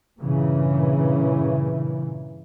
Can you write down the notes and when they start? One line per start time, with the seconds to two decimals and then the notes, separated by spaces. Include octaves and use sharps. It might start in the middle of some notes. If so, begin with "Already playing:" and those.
0.19 G2 A#2 C#3 E3